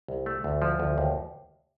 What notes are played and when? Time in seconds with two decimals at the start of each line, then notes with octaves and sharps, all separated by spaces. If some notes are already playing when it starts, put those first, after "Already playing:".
0.08 C2
0.26 A3
0.44 D2
0.62 F3
0.80 D2
0.98 D#2